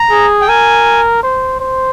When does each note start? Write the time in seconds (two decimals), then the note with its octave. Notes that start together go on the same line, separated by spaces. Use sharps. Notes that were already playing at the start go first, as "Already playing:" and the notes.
Already playing: A#5
0.10 G#4
0.41 G5
0.48 A#4 G#5
1.23 C5
1.60 C5